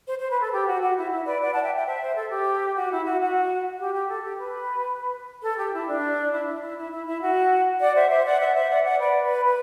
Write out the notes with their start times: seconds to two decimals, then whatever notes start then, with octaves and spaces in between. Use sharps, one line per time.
0.07 C5
0.19 C5
0.31 B4
0.41 A4
0.53 G4
0.67 F#4
0.82 F#4
0.97 E4
1.12 E4
1.26 B4 D5
1.42 D5 F#5
1.52 F#5 A5
1.64 E5 G5
1.75 E5 G5
1.86 C5 E5
2.01 C5
2.16 A4
2.31 G4
2.76 F#4
2.90 E4
3.05 F#4
3.20 F#4
3.79 G4
3.94 G4
4.09 A4
4.24 G4
4.39 B4
5.43 A4
5.58 G4
5.73 E4
5.87 D4
6.32 E4
6.47 E4
6.62 E4
6.77 E4
6.92 E4
7.06 E4
7.21 F#4
7.80 D5 F#5
7.95 C5 E5
8.11 C5 E5
8.25 D5 F#5
8.40 C5 E5
8.55 C5 E5
8.70 D5 F#5
8.85 D5 F#5
8.99 B4 D5
9.22 B4
9.44 B4